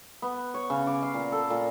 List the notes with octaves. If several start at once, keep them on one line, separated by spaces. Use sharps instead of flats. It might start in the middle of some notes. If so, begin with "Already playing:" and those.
B3
C#5
C#3
D6
F5
A#2
A4
A#2